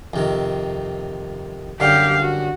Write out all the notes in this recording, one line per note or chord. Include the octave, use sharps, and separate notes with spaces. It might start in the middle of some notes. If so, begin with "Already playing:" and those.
F2 C3 D#3
F#2 D3 G3 G4 F5
F#4